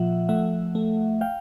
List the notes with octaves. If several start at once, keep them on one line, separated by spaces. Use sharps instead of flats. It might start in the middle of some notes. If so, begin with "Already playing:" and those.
Already playing: A#2 F3 E5 F#5
A3 E5 F#5
A3
F5 G5